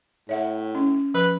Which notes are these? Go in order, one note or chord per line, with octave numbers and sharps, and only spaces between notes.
A2 C#5 E5 F#5
C#4
F3 B4